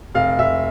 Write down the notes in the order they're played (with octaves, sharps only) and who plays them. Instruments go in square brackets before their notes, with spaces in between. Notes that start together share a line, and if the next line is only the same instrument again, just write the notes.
[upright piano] F1 F5
F1 E5